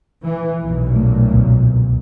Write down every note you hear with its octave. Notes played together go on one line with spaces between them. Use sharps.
E3
B1 F#2 A#2
A3
C#2 B2 D3